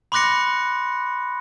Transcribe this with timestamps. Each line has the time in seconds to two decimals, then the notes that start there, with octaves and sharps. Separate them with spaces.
0.12 B5 C6 D6 F#6 A#6 C#7